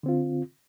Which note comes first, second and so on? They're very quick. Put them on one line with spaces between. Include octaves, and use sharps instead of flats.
D3 C4 F4